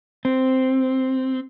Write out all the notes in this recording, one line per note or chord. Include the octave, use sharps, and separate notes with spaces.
C4